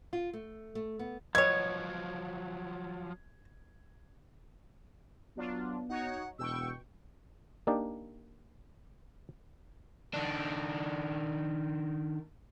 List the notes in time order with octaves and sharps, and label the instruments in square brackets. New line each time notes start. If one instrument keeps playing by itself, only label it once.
[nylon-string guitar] F4
A3
A3
B3
[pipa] B2 C#5 [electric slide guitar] F3 F#3 [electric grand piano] G#6
[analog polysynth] F#3 D4 F4 [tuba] B3
[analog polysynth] D#4 F#4 C#5 [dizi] F#5
[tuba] E1 [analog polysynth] B2 G5 C#6 [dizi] E6
[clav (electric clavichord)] A#3 D4 D#4 G4 D5
[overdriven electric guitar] D#3 D4